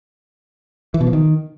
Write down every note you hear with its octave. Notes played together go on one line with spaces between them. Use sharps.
E3
B2
F3
D#3